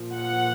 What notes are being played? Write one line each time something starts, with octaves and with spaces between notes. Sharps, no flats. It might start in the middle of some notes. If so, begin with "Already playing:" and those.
Already playing: A#2 F3
F#5